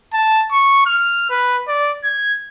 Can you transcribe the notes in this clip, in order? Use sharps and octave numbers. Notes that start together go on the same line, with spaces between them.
A5
C#6
F6
B4
D5
G#6